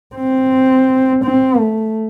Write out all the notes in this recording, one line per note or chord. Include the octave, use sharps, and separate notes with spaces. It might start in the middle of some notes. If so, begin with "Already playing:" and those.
C4
C4
A3